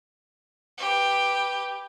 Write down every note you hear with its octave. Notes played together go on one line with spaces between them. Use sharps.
G4 B4